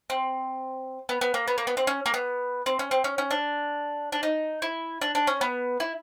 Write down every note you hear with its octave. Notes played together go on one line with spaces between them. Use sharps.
C4
B3
B3
A#3
B3
A#3
B3
C4
C#4
A#3
B3
C4
C#4
C4
C#4
C#4
D4
D4
D#4
E4
D4
D4
C#4
B3
E4